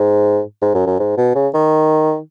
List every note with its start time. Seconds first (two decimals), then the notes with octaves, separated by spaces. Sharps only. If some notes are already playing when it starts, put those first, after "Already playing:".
Already playing: G#2
0.62 G#2
0.75 F#2
0.86 F#2
0.99 G#2
1.17 B2
1.35 C#3
1.54 D#3